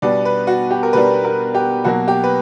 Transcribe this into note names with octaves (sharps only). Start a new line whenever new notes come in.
B2 G3 B3 D4 D5
B4
F#4
G4
A#4
B2 G3 B3 D4 B4
A#4
G4
B2 F#3 A#3 F#4
G4
B4